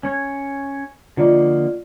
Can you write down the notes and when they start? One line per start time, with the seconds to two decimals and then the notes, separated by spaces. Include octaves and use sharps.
0.03 C#4 C#5
1.17 D3 F3 A#3 F4 D5 D#5